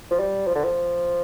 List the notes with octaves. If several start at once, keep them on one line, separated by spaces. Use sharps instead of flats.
F3
G3
F3
D3
F3